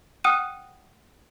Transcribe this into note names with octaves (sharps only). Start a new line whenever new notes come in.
F#5 G5 D#6 F6 F#6 D#7